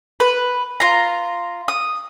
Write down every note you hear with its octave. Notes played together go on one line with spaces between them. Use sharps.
B4
F4 A#5
D#6